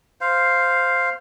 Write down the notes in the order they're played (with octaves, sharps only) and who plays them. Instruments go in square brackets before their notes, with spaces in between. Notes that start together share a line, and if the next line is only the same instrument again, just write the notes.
[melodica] C5 F5